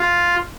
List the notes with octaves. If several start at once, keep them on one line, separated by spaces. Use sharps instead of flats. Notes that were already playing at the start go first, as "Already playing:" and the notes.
Already playing: F4